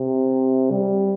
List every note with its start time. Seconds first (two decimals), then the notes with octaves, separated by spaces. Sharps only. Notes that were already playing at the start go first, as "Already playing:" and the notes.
Already playing: C3
0.71 G3